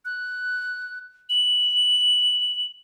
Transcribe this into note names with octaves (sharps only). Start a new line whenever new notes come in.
F#6
F#7